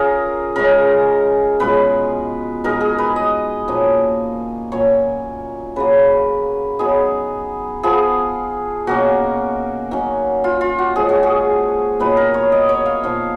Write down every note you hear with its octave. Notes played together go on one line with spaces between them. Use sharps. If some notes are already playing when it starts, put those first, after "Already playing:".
Already playing: C#4 F4 G#4 A#4
C#3 G#3 C#4 A#4
B2 G#3 C#4 F4 B4
B2 G#3 D#4 A#4
G#4
B4
D#5
A#2 F3 A#3 C#4
A#2 F#3 A#3 C#4 C#5
C#3 F#3 A#3 B4
F#3 B3 D#4 G#4
F3 B3 F4 G#4
B2 A#3 C#4 F#4
D#3 F#3 C#4
F4
F4
F#4
F3 G#3 C#4 F4 G#4
F#4
G#4
A#2 F#3 B3 D#4 B4
A#4
C#5
D#5
C#5
F5
A#2 F3 B3 D#4 F5